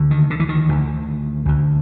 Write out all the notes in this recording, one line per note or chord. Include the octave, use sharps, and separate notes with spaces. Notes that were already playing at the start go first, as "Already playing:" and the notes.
Already playing: D2 D3
D#3
D3
E3
D#3
D2 D3
D2 D3